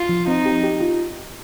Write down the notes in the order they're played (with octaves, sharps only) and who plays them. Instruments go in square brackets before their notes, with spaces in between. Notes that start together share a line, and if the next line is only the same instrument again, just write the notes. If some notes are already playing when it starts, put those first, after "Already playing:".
Already playing: [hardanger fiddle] F4
[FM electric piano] F3
[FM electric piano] C4 [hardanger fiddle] D#4
[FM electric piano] G4
G4
F4